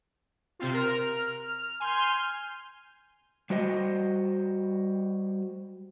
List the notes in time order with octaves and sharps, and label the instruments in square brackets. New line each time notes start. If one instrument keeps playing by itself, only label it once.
[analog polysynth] C3 C4 F4
A#4 F6
F6
G#5 C6 F6 G6
[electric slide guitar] G3 F#4 C5 D#5